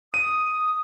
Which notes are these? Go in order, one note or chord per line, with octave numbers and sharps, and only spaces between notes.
D#6 D#7